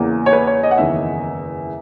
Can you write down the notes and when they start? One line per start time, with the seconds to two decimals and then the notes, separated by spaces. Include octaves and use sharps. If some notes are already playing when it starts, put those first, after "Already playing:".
Already playing: E2 C#3 E3 A#3
0.26 C#5
0.33 B4
0.47 C#5
0.63 D#5
0.71 F#5
0.78 F#1 E2 D#3 E5